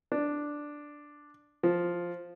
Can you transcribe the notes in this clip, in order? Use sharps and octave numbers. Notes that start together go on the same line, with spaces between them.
D4
F3